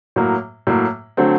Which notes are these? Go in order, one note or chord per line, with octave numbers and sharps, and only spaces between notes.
A2 F#3 A#3
A2 F#3 A#3
D3 F#3 A3 C4